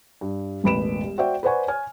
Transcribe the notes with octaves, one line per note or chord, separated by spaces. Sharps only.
G2
E1 A1 B4 B5 D7 E7
G3
F#4 C5 D5 E5 G5
B4 C5 D5 F#5 G#5 C#6
C#5 G#5 F6